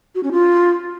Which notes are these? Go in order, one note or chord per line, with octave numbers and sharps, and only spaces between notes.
F#4
C#4
F4